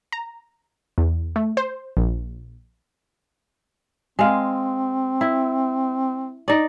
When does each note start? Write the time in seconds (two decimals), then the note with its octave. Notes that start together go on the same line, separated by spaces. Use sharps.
0.12 A#5
0.98 E2
1.36 A3
1.57 C5
1.97 A#1
4.19 G#3 C4 F5
5.21 E4
6.48 D#4 D5